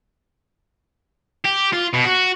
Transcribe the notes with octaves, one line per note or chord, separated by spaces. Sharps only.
G4
F4
B2
F#4